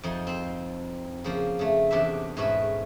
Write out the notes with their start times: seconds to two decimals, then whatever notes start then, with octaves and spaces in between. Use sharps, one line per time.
0.03 F2 F3 D#4
0.27 C4 C5
1.24 C#3 F3 A#3
1.59 C#3 A3
1.91 E2 C3 D4 B4 E5
2.37 G#2 B2 A3 C#4 B4 B5